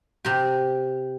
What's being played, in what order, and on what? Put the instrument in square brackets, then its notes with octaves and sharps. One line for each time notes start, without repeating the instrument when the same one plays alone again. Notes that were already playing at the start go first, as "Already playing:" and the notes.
[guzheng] C3 G4